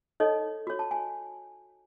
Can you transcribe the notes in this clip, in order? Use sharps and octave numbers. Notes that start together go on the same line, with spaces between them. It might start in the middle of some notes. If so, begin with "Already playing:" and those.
D#4 A4 C#5 D#5
F#4 C#5
A5
G#5